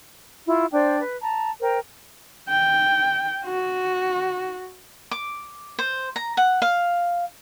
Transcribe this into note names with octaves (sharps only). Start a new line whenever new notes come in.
E4 F4
D4 C5 D5 G5
B4
A5 A#5
A#4 C5 G5
G5
F#4
D6
C5
A#5
F#5
F5